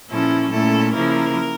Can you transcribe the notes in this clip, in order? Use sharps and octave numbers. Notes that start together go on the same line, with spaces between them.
A#2 F3 C#4 E4 A4
A#2 A3 C#4 E4 A4
C#3 F3 A#3 E4 A#4